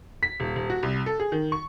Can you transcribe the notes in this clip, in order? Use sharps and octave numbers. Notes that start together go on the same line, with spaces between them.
B6
D#1
D#1
F#4
C2
A4
G#4
D#3
C#6